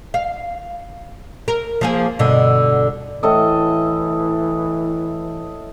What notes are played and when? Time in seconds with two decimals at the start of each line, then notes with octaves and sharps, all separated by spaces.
0.14 F5
1.48 A#4
1.81 F3 A#3 G#4
2.19 G2 B2 D3
3.23 A2 E3 A4 D#5